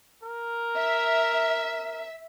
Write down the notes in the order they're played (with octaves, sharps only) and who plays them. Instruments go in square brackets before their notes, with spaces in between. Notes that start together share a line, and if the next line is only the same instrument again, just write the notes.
[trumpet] A#4
[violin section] E5